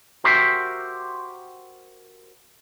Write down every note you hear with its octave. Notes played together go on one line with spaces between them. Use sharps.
F#4 G4 A#4 C5 E5